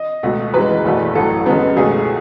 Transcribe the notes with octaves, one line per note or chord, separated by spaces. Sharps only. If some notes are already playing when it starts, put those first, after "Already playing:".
Already playing: D#5
C#2 B2 A3
F#2 E3 G#3 B4
F#1 E2 B2 A3
A1 A2 F#3 A4
F#2 C#3 G#3 B3
C#2 B2 A3 G#4